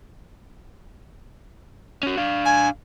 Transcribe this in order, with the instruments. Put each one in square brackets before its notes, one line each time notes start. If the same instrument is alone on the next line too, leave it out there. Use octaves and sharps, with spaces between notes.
[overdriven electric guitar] C#4 F#4
D4 F5
[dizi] G#5